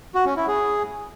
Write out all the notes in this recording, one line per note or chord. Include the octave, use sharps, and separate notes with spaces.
F#4
C#4
E4
G#4